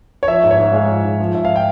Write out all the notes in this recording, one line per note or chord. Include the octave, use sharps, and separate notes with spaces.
C#5
F3 E5
G#2
C#5
G#2
G#3 F5
F3
G#2
F3
G#2 E5
F5
G5